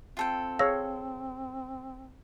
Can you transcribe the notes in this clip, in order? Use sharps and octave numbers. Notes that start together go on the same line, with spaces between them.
C4 F4 A4 G5
G#4 C#5 F5 E6 A#6